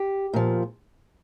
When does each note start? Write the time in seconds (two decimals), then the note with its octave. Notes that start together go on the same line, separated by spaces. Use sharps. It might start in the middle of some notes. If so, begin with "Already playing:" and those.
Already playing: G4
0.34 A#2 F3